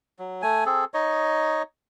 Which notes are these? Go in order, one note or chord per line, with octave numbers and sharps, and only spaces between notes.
F#3
A3 G#5
C4 G#4 A4
D#4 C#5 D#5